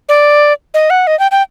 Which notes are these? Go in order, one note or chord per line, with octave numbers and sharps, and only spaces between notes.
D5
D#5
F#5
D#5
G5
G5